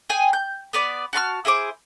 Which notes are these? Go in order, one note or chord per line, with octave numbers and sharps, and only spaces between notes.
G#4 G5 G#5
G6
B3 B4 D5
F#4 A5 C6 F6
E4 G#4 C5 D6